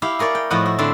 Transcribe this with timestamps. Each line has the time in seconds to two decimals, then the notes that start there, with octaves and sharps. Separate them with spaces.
0.02 E4 G4 F5
0.19 G#4 A#4 C#5 D5
0.35 G5
0.50 A2 F3 E4 F#4 D#5 F#5
0.66 F#4
0.78 D3 C4 E4 E5 A5